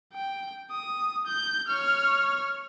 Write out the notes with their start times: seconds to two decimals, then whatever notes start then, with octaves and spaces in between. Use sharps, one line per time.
0.14 G5
0.72 D#6
1.27 G6
1.68 C#5 F6